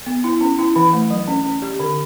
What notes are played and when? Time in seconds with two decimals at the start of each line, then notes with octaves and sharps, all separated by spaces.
0.06 B3
0.24 E4
0.41 C#4
0.59 E4
0.76 E3
0.93 A3
1.10 F#3
1.28 C#4
1.45 C#4
1.62 G4
1.80 D3